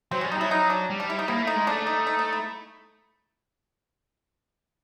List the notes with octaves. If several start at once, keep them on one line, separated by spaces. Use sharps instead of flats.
F#3 C4
G3 C#4
D#4
F#3 E4
D#4
D4
G3
D4
E4
D#4
A#3 E4
A3
D#4
G#3
A3 D4
D#4
D#4
D#4
E4